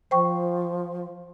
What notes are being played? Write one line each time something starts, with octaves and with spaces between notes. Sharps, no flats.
F3 C5 G5 C#6